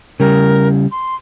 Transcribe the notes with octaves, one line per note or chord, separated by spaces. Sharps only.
C#3 G3 A#4
C6